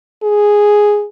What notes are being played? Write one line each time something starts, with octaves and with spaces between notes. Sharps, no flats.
G#4